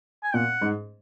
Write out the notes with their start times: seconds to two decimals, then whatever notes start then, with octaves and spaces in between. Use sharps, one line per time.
0.23 G#5
0.34 A#2 F#5
0.61 G#2